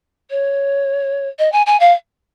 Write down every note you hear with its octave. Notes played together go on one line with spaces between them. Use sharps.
C#5
D#5
G#5
G#5
F5